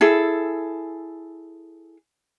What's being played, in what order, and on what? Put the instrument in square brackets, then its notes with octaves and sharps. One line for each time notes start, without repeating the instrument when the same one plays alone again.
[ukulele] E4 G#4 A4